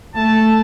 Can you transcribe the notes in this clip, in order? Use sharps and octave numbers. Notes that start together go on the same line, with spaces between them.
A3 A5